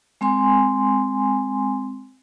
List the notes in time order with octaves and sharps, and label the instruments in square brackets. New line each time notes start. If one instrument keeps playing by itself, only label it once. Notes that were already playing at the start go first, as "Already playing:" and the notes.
[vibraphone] G#3 C4 G#5 C6